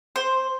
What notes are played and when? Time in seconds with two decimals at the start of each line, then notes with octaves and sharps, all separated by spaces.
0.16 C5